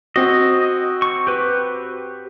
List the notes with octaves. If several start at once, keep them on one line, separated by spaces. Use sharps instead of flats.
C4 F#4 D#5
C#6
G4 B4